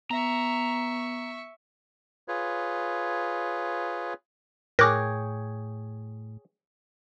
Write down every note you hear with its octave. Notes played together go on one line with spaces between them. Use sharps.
B3 E5 A#5 C#6
F4 G#4 B4 C#5
A2 G#4 A#4 C#5 G5 D6 F#6 A#6